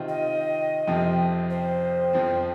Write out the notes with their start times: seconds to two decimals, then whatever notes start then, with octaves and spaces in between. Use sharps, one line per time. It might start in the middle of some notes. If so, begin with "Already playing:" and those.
Already playing: C3 D#3 C4 F4
0.09 D#5
0.87 F2 C3 F3 C4
1.50 C5
2.13 F2 F3 C4